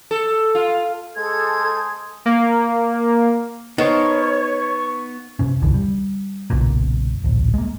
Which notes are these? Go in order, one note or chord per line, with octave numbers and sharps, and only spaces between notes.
A4
F4
G#3 G#4 A4 C5 G#6
A#3
B3 D#4 A#4 C5 C#5 A5 C#6
F#2 C3 C#4
D#1 C2 D3 E3
G3
F#1 B1 F#2 A#2
D1 A#1
G#3 A#3